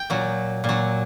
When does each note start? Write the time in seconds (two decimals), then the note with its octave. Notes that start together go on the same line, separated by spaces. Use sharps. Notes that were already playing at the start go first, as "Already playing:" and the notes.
Already playing: G5
0.10 A#2 F#3
0.64 A#2 F#3